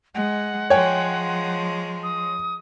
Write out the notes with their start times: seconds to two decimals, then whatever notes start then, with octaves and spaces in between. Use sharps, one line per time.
0.15 G#3 F#5
0.70 F3 G#3 C#5 G5 G#5
2.03 D#6